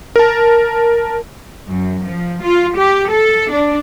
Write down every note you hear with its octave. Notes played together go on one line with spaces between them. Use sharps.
A#4 A5
F#2
F3
F4
G4
A4
D4